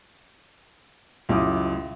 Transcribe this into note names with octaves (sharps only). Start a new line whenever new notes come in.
C#2 F#2 E4 D6 D#6